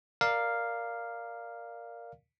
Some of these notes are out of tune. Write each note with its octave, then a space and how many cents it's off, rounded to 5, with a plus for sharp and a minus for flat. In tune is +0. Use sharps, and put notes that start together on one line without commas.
A#4 +0 D5 +10 F5 +0